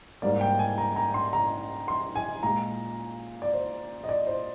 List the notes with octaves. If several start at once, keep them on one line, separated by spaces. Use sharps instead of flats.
G#2 G3 A#3 D5
G5
G#5
A#5
A#5
C6
A#5
C6
G#5
A#2 G#3 A#5
D5
C5
D#5
D5
C5